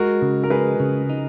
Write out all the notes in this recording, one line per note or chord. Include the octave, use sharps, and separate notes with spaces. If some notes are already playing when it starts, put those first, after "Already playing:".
Already playing: G#3 F#4 A#4
C#3
A#4
G#3 G#4 B4
C#3
D#4